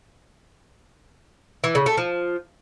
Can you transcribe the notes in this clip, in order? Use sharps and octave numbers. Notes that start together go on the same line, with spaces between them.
E3
C#3
A3
F3